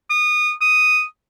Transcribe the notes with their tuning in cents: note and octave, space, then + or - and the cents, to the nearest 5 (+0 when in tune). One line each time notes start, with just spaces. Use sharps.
D#6 -25
D#6 +0